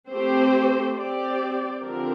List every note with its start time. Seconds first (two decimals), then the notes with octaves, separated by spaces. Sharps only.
0.10 A3 C4 G4 C5
0.97 C4 G4 D5
1.83 D3 F3 C4 G4 A#4